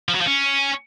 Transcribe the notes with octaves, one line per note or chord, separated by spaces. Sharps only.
F3
F#3
F3
C#4